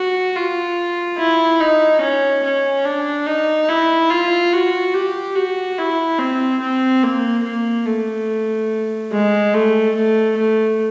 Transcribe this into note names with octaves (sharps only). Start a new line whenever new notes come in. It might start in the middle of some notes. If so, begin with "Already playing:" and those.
Already playing: F#4
F4
E4
D#4
C#4
C#4
D4
D#4
E4
F4
F#4
G4
F#4
E4
C4
C4
A#3
A#3
A3
G#3
A3
A3
A3